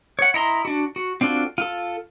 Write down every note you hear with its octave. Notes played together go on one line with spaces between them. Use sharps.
C#5 F#5
E4 D#5 A#5 C6
D4 F#4
F#4
C4 D4 F4 F#4 A4
F4 A4